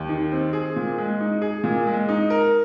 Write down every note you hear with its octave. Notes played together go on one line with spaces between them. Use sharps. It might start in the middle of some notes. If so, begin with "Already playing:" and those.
Already playing: D#2
D#3
C4
G#4
A#2
G#3
D#4
G#4
A#2
G#3
D#4
A#4